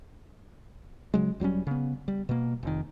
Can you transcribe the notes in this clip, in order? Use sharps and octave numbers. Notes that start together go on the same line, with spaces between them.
C#3 F#3 G#3
E1 F#3 G3 C#4
C#3 B3
G3
B2 A#3
F1 D#3